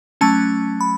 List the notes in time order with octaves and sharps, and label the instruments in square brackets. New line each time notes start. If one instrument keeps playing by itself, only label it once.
[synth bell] F#3 A3 C#4 A5
B5